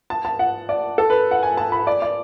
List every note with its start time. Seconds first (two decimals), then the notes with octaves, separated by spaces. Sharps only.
0.10 A5
0.25 A5
0.39 F#5
0.69 D5
0.98 A4
1.10 B4
1.31 F#5
1.43 G#5
1.57 A5
1.72 B5
1.87 D5
2.02 D5